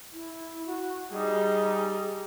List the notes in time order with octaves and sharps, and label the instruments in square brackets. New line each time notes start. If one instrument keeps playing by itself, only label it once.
[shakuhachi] E4
F#4
[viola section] G3 D#4 [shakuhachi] G#4